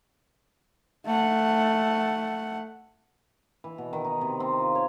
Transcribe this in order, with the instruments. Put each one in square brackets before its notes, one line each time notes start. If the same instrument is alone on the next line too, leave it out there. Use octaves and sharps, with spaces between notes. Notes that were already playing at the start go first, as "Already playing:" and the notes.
[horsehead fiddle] A3 F#5
[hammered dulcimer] E3
B2
D#3
D#4
C3
C4
F4
C#5